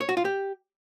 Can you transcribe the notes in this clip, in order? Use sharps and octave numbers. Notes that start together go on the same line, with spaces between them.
C#5
F#4
F4
G4